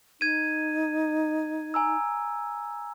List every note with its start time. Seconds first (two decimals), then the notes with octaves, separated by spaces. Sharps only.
0.21 D#4 G#6 D#7
1.74 G#5 A#5 E6